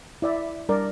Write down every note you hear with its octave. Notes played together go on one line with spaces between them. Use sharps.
E4 D5 E5
G3 D4 A#4 D5